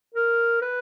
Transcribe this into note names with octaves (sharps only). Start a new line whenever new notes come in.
A#4
B4